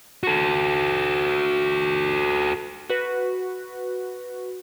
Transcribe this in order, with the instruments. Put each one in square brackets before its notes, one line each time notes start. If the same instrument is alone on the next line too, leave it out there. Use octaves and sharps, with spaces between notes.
[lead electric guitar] F#4 A4
[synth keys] F#4 B4